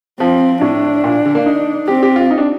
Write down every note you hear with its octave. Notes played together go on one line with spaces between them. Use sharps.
F3 C4
A2 D4
A#2
D3
A#3
D#4
C4 G4
G4
F4
D#4
D4